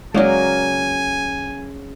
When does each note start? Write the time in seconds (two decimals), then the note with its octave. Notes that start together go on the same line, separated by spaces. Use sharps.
0.14 C#3 F#3 G#3 A#3 F#4 A#4 D5 G#5